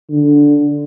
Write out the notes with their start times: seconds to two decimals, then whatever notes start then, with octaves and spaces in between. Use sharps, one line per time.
0.10 D3